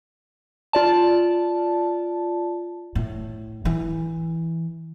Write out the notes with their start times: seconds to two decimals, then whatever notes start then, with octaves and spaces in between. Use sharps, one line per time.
0.73 F4 D5 A5
2.95 A2
3.65 E3